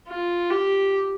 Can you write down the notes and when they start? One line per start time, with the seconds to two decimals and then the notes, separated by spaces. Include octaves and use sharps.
0.08 F4
0.50 G4